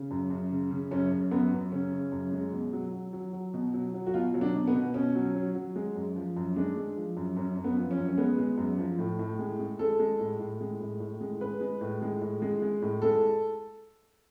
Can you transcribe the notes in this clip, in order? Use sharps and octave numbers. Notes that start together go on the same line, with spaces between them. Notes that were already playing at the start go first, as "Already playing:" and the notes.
Already playing: C#3
F#2
F#2
C#3
C#3
F#2 C#4
F#2
F#2 B3
F#2
C#3 C#4
C#3
F#2
G#3
B2
F#3
F#3
F#3
F#3
B2
F#3
F#3
F#4
B2 F4
F#3
D4
B2
B3
B2
B2 C#4
F#3
F#3
F#3
G#3
F#2
F3
F#2
G#3 D4
G#3
F3
F#2
F#2 C#4
F#2
B3
F3
C#4
F#2
C#4
G#3 B3
G#3
F#2
F3
A2
A2
G#3
G#3
G#3 A4
G#3
A2
A2
G#3
A2
A2
G#3
G#3 B4
G#3
A2
G#3
A2
G#3
G#3
A2
G#3 A4